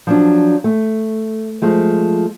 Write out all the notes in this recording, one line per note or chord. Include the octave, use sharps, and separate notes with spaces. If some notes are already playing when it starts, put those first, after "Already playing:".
F3 F#3 D4
A3
F3 G#3 A3